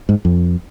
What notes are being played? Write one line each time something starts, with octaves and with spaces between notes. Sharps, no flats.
G#2
F2